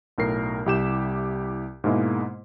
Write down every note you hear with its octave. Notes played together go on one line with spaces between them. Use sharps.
B1 A2 A#4 C7
C2 E4 G4 G6 E7
G#2 B2 G#3 A#3 D#4 E4